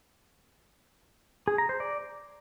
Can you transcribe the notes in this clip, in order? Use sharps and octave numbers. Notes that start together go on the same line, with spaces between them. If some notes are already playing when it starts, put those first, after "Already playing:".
G#4
A#5
C5
D5